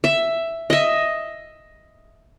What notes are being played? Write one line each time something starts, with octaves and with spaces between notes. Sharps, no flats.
E5
D#5 E5